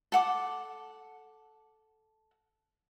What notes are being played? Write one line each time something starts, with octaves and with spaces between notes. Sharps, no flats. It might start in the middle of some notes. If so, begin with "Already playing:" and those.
A4 F#5 D6